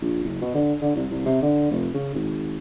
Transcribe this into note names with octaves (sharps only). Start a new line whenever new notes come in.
A#1
F#1
B2
D3
D3
C2
C2
C3
D3
F1
C#3
G#1